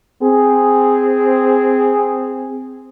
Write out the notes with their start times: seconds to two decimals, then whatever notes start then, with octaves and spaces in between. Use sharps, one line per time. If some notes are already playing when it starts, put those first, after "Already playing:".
0.23 C4 G#4